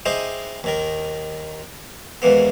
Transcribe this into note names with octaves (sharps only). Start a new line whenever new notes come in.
D#4 E4 G4 G#4 C5 D#5
D#2 D#3 A#4
D#2 G#2 E3 A#3 B3